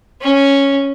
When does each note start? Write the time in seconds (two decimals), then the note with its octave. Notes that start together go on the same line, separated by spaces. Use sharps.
0.21 C#4